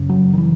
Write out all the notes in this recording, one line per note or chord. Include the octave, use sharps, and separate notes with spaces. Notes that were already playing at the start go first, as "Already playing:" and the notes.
Already playing: F#2 C#3
F#3
D#3
E3